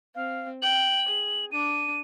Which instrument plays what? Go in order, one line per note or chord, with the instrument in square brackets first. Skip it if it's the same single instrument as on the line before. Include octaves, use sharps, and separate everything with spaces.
[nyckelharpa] C4 [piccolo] F5
[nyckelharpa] G5 [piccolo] F#7
[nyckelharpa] G#4
[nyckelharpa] D4 [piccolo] D#7